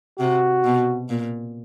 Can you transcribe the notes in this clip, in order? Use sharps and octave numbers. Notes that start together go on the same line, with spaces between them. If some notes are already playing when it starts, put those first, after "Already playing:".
C3 F#4
B2
A#2